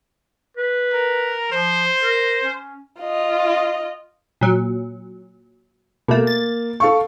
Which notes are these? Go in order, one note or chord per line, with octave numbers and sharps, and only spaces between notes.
B4
A#4
F3 C5
A#4
C#4
F4 D#5
A#2 F#3
B2 A3 A#3
A6
A4 F5 C#6